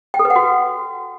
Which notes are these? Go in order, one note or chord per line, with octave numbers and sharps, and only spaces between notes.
G5
A4
B4
F#5
F#4